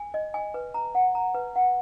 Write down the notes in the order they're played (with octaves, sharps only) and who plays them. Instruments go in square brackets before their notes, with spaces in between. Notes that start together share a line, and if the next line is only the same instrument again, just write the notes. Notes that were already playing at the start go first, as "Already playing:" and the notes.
Already playing: [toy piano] G#5
D#5
G#5
B4
A#5
F#5
A#5
B4
F#5